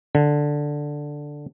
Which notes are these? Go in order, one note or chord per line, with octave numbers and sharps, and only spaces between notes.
D3